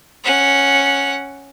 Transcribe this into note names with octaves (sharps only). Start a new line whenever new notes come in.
C#4 F#5